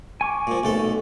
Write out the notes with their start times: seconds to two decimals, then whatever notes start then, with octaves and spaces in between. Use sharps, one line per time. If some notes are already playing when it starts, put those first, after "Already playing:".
0.21 G#5 C#6 D6
0.47 A#2 F3
0.63 B1 A3 A4